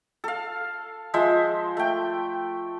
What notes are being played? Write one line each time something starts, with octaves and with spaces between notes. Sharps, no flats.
A4 F5
F3 G#3 C5 E5
A3 G5